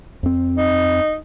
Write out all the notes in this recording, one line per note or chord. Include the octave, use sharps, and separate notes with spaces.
F2 C4
D#4